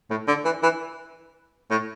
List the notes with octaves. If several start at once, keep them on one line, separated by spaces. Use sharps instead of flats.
A2
D3
E3
E3
A2